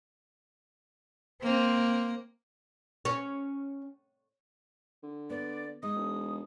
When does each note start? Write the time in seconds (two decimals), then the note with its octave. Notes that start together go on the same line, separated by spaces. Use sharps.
1.42 A#3 C4
3.05 C#4
5.03 D3
5.30 B3 D5
5.83 G#3 D#4 D#6
5.95 E1